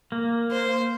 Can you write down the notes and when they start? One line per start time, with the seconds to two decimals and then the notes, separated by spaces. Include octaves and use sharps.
0.12 A#3
0.51 C5